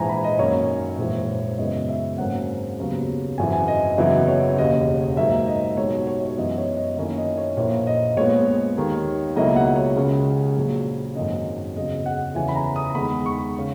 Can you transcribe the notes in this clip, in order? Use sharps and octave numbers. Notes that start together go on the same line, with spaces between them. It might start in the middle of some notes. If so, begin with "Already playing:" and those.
Already playing: A#1 G#2 E3 G#5 A#5
B5
D#5
F#2 D#3 A#3 C#4 C#5
A#1 G#2 E3 G#3
F#2 C#3 G#3 B3 E4 D#5
E5
G#1 G#2 F#3 A#3 C#4 F#5
D#2 C#3 F#3 B3
G#1 F#2 E3 G#5
G#5
D#5
F#1 F#2 E3 B3 E4 D#5
C#5
E1 D#2 C#3 D#5
G#2 F#3 A#3 D#4 E5
D#5
B1 B2 G#3 D#4 C#5
C#5
C#5
F#2 E3 B3 D#5
C#5
D#5
F#2 D#3 A#3 C#4 E4 E5
D#5
C#5
A#1 A#2 A#3 E4 C#5
D#5
A#1 A#2 G#3 B3 C#5
D#2 D#3 A#3
C#2 B2 F#3 A#3 E4 D#5
F#5
C#5
C#2 C#3 G#3 C#4
A#1 A#2 F#3
G#1 F#2 D#3 A#3 C#4 D#5
E2 C#3 F#3 D#5
F#5
E2 C#3 E3 G#5
B5
A#5
D#6
A#5
E2 D#3 G#3 B5
C#6
C#3